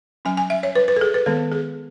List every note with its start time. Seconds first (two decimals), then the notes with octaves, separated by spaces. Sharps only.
0.25 F#3 C#4 G#5
0.37 G#5
0.50 E5
0.63 C#5
0.75 B4
0.88 B4
0.96 A4
1.01 G#4
1.14 B4
1.26 D#3 G#3 B3 A4
1.52 G#4